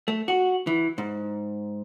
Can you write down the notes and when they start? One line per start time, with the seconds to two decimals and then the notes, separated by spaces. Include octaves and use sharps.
0.08 A3
0.28 F#4
0.67 E3
0.98 G#2